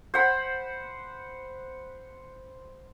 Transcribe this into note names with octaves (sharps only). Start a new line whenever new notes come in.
C5 F#5 B5